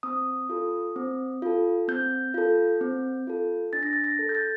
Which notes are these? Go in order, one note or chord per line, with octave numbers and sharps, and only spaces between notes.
C4 D#6
F4 A4
C4
F4 A4
C4 G6
F4 A4
C4
F4 A4
D4 A6
A#6
A6
A#6
A4
G6
A6